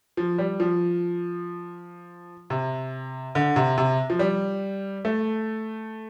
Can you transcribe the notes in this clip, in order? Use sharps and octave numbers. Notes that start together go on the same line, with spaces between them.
F3
G3
F3
C3
D3
C3
C3
F3
G3
A3